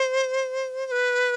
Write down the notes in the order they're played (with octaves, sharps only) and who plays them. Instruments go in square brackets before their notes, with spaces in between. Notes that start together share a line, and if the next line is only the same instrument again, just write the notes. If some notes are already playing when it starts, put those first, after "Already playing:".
Already playing: [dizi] C5
C5
B4